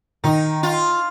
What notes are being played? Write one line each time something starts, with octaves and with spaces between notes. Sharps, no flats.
D#3 D#4
F4